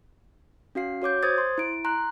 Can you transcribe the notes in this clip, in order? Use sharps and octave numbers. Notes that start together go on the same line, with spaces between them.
C#4 F#4 F5 C7
F#4 C#5 D6 G6
C5 D#6 G#6 A6
C6
E4 D7
A#5 C6 F#6